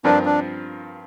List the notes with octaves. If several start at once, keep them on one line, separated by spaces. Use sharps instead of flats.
G2 F3 C4 D4 F4 A#4
D4